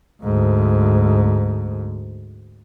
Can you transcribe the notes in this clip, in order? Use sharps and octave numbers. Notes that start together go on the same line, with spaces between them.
D2 G#2